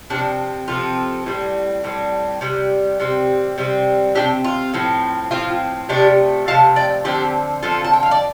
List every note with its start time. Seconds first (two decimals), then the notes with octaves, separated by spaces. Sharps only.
0.10 C3 F3 C4 D4
0.68 C3 F3 C4 F4 A4
1.26 A2 G3 C4
1.84 A2 G3 C4
2.41 C3 G3
3.00 C3 G3 C4
3.58 C3 G3 C4
4.15 C3 G3 C4 D4 G4
4.44 F4
4.74 A2 F3 C4
5.31 A2 F3 C4 F4
5.89 C3 F3 A3 D4 G4
6.47 C3 F3 A3 F5 A5
6.76 D5 G5
7.05 D3 F3 C4 D4 G4
7.63 D3 F3 C4 F4 A4
7.84 A5
7.93 G5
8.03 F5
8.11 D5